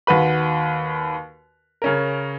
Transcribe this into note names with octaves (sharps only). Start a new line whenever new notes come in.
D#2 F#4 B4 B5
C#3 C#4 A#4